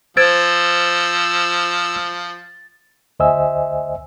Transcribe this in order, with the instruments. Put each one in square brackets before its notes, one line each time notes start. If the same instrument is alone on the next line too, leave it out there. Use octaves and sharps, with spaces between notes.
[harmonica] F3 [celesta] C5 G#6 D7 [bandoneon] E6 [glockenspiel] A6
[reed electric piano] D2 C5 D#5 E5 G#5 E6